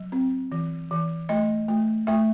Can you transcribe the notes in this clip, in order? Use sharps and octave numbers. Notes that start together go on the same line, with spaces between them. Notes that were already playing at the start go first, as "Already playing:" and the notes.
Already playing: F#3
C4
E3
E3
A3 D#5
A3
A3 E5